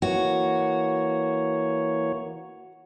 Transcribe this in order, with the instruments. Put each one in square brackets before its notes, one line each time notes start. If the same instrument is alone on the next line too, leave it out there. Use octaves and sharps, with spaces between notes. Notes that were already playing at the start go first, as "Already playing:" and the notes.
[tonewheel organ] E3 A#3 C#5 [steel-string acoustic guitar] F#4